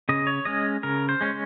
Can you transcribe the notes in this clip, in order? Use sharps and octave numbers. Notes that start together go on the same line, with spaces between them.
C#3 D#5
C#5
G#3 C#4 D#5
C#3 A#4
C5
G#3 C#4